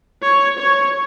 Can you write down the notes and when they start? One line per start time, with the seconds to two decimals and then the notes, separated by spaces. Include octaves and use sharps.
0.22 C#5
0.59 C#5